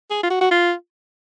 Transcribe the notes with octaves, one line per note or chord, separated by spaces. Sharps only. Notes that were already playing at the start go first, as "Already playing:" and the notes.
G#4
F4
F#4
F#4
F4